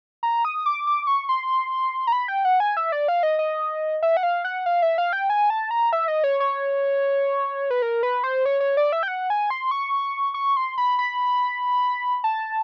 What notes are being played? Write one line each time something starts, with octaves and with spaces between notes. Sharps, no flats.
A#5
D#6
D6
D6
C#6
C6
A#5
B5
G5
F#5
G#5
E5
D5
F5
D#5
D#5
E5
F#5
F5
F#5
F5
E5
F5
G5
G#5
A5
A#5
E5
D#5
C#5
C#5
B4
A#4
B4
C5
C#5
C#5
D5
E5
G5
F#5
G#5
C6
C#6
C#6
C6
B5
B5
A5